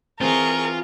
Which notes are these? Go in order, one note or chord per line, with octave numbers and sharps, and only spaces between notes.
E3 C4 F4 G#4 A#4 C#6